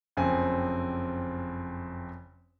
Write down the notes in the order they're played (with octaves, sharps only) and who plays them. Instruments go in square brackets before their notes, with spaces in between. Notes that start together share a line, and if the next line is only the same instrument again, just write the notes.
[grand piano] F#1 F2 C4 G#5